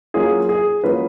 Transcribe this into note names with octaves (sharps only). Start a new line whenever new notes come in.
F#3 A#3 C#4 F4 G#4
G#4
F#3 A#3 C#4 F4 B4